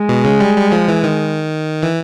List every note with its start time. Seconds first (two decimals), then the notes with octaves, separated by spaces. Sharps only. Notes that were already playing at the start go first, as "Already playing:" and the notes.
Already playing: G#3
0.09 B2
0.25 C#3
0.40 G3
0.56 G3
0.72 F3
0.88 E3
1.04 D#3
1.83 E3